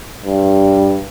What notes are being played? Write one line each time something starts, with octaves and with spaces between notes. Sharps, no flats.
G2